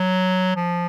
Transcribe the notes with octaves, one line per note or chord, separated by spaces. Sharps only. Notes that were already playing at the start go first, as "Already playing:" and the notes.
Already playing: F#3
F3